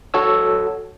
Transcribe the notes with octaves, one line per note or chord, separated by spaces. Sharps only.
F#4 A4 C#5 E6